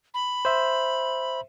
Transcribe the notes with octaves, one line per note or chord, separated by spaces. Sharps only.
B5
C5 E5